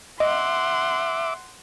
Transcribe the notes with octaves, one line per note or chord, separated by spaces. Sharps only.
D#5 E5 F#5 C6 D6